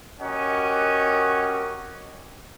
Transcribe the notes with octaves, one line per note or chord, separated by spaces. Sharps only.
C#4 F#4 G4 A#4 D#5 F#5